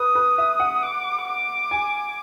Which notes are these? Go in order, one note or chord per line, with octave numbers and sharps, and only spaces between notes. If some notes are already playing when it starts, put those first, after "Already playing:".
Already playing: B4 D#6
B4
E5
F#5
D6
D6
G#5